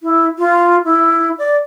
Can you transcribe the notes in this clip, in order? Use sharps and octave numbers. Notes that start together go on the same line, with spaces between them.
E4
F4
E4
D5